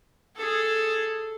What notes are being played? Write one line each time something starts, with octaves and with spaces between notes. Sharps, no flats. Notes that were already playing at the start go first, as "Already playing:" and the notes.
G#4 A4